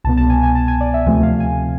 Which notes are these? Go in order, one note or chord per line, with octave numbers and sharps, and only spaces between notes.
C2 B2 B3 A5
A5
G#5
G#5
A5
G#5
D5
E5
D2 C3 F3 A3 C4 G#5
F5
G#5